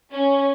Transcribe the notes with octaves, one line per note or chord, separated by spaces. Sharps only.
C#4